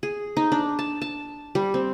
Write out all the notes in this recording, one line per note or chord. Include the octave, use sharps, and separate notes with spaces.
G#4
D#4
D4
A5
A5
G3
C4